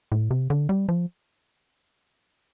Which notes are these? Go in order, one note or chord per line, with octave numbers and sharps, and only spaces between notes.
A2
C3
D3
G3
F3